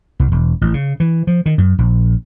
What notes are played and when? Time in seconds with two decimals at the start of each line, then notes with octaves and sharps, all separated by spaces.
0.20 C2
0.32 E1
0.61 A1
0.74 C#3
1.00 E3
1.27 F3
1.46 D#3
1.58 F#2
1.78 A#1